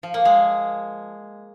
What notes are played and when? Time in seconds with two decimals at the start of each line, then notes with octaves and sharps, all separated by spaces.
0.03 F3
0.14 A#3
0.25 G#3